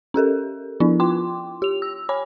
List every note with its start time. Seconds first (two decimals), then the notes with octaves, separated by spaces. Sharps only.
0.14 C#4 G4 A4 A#4
0.80 F3 B3 D4 E4
1.00 F4 G5 C6 D6
1.62 G4 F7
1.82 E6
2.09 C#5 G#5 B5 D6